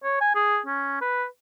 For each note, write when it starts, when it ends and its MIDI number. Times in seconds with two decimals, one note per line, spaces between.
0.04 0.17 73
0.21 0.31 80
0.35 0.59 68
0.66 0.99 61
1.01 1.26 71